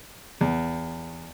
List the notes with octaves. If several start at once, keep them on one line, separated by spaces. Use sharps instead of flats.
E2